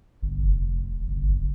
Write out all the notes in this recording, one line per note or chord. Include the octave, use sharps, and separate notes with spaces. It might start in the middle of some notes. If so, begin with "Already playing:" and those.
G1
F1
G1
F#1